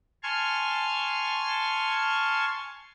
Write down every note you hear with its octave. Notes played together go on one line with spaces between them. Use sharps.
G#5 A5 C6 C#6 F6 G#6